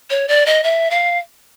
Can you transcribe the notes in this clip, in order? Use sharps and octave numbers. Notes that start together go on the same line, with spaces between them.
C#5
D5
D#5
E5
F5